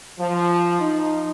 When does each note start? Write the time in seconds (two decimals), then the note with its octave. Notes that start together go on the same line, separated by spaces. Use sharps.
0.20 F3
0.81 D#4